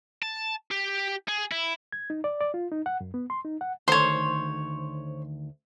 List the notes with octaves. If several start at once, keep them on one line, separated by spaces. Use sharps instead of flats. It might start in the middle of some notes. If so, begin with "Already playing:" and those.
A5
G4
G#4
E4
G#6
D#4
D5
D5
F4
D#4
F#5
F#2
B3
C6
D#4
F#5
D2 D#3 A4 C5 C#5 C6